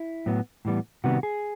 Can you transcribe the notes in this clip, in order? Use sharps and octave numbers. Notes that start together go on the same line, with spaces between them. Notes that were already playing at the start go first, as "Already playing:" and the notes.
Already playing: E4
A2 F#3 B3
A2 E3 G3 B3
C3 D#3 G3 B3 F#4
G#4